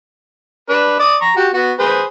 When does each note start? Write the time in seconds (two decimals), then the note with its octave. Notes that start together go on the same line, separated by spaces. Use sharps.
0.69 D4 B4
0.99 D5 D6 D#6
1.21 A#5 C#6
1.36 F#4 G4
1.54 B3 F#4
1.79 G#4 B4 C5